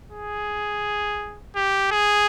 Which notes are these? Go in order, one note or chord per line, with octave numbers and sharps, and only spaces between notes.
G#4
G4
G#4